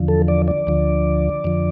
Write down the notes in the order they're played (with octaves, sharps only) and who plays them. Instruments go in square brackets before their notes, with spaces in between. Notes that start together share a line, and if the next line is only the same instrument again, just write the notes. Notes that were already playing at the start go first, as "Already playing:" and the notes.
Already playing: [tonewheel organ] E2 D3 F3
A4
D5
D5
D2 D3 F3
F2 D3 F3